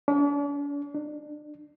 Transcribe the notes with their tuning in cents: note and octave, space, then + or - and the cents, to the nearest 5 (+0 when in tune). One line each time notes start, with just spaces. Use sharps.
D4 -45
D4 +30